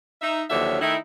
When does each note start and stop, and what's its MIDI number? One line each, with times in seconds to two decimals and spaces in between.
0.22 0.43 63
0.22 0.43 76
0.50 0.81 39
0.50 0.81 50
0.50 0.81 53
0.50 0.81 54
0.50 0.81 73
0.50 0.81 76
0.81 0.96 51
0.81 0.96 57
0.81 0.96 63
0.81 0.96 64